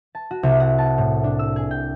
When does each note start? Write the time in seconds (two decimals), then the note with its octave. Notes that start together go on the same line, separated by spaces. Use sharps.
0.15 A5
0.31 F#4
0.43 C2
0.60 F#5
0.78 A5
0.98 A2
1.24 D4
1.39 E6
1.56 G#4
1.71 G5